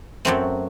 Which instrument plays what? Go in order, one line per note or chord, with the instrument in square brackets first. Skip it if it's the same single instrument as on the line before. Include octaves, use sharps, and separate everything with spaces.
[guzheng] F#2 F#3 A3 C4